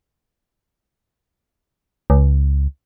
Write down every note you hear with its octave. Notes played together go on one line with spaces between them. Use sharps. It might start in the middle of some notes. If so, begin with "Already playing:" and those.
C#2